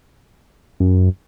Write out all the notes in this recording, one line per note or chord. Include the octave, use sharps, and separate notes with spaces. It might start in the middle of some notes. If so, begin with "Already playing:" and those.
F#2